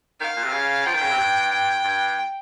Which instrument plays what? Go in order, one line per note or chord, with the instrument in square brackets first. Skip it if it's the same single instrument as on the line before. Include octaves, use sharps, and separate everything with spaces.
[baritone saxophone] D#3 [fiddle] F5
[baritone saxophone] A#2
C3
C#3
[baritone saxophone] F3 [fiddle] G5
[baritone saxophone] D#3
C#3
C3
G2
[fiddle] G5
[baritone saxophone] G2